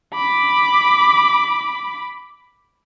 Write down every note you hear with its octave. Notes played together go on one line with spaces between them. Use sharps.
B5 D6